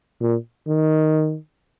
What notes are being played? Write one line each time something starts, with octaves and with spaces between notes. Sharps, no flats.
A#2
D#3